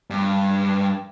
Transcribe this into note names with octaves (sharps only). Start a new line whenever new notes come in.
G2